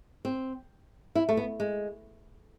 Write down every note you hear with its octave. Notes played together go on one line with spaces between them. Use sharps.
C4
E4
A3
B3
G#3